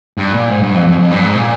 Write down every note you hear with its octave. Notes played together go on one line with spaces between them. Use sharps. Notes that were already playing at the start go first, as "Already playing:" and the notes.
G2
A#2
G#2
G2
F2
F2
F2
G2
G#2
A#2